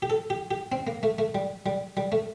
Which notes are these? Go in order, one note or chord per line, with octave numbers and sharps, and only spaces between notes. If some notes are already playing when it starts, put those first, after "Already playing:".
G4
A4
G4
G4
C4
A#3
A3
A3
G3
G3
G3
A3